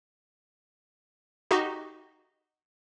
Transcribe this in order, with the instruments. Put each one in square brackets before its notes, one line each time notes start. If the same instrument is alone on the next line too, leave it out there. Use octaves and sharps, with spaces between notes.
[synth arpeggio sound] D#4 F#4 G4 D#5